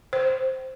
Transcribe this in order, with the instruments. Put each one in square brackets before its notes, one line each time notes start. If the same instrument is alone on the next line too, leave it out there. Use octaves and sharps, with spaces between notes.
[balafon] C5